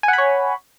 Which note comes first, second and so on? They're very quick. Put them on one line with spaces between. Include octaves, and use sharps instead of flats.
G#5 F#5 B5 C#5